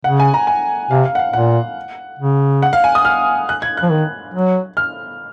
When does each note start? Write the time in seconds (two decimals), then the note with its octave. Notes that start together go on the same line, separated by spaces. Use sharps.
0.04 C#3 F#5
0.20 G#5
0.34 A#5
0.47 G#5
0.91 C3 F5
1.06 F5
1.15 F#5
1.19 F5
1.33 A#2 F#5
2.19 C#3
2.62 F#5
2.73 F5
2.84 G#5
2.95 D#6
3.05 F6
3.49 F#6
3.62 G#6
3.77 F#6
3.83 F3
3.91 D#3
4.34 F#3
4.77 F6